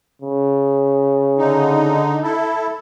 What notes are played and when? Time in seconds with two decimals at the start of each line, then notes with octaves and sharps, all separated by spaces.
0.22 C#3
1.38 D3 D#4
2.23 E4 A4